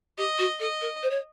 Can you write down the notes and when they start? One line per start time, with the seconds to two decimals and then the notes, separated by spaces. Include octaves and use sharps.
0.18 G4 D#5
0.39 F#4
0.60 A4 D#5
0.81 A#4
1.03 C5
1.10 C#5